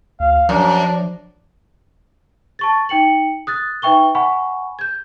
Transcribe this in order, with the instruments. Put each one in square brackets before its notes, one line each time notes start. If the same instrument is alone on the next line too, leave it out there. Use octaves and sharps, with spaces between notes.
[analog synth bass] D2 [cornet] F5
[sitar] F#2 [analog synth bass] F3 [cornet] D4
[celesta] A5 C#6 A6
D#4 G5 C#7 F#7
D#6 F#6 A6
D#4 B4 E5 G5 C#6 G7
F#5 G#5 B5 C#6
G6 G#6